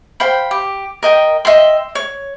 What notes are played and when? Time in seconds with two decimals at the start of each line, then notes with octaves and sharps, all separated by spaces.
0.20 C5 F5 G5 B5
0.51 G4
1.03 A#4 D#5 G5
1.45 D#5 E5 G5 C6
1.95 C#5